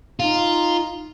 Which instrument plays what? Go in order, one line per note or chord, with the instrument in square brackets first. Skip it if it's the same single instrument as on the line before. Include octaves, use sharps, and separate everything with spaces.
[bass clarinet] D#4 [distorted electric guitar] F4